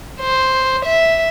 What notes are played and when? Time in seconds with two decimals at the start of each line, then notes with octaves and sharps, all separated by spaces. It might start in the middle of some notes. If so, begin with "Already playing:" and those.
0.21 C5
0.85 E5